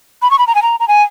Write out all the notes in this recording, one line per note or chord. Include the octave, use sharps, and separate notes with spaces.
B5
C#6
B5
A#5
G#5
A#5
A#5
G#5